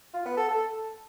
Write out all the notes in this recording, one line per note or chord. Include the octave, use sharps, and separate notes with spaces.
F4
B3
A4
A4